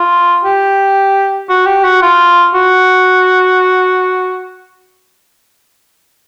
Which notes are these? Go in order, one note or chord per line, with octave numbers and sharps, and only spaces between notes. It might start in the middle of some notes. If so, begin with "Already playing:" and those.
Already playing: F4
G4
F#4
G4
F#4
F4
F#4